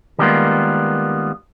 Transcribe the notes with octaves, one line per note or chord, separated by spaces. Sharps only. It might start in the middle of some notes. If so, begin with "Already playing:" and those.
D#3 G3 G#3 A#3 B3 F4